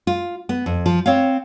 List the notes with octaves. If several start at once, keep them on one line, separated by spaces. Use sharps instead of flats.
F4
B3
F2
F3
C4 C#5 F5